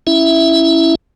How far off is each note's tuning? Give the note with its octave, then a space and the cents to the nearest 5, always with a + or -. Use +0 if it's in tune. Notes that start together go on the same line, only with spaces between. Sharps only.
C#4 +0 E4 +0 E5 +0